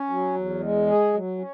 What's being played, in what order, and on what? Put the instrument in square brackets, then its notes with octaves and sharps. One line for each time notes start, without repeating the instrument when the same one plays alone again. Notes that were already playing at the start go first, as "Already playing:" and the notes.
Already playing: [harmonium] C#4
F#3
E2
G#3
G#4
F#3
C#4